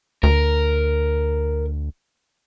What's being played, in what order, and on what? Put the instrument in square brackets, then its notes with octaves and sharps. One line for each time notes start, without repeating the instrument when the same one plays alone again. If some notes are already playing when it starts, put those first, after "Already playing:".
[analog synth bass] D2 [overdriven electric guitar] A#4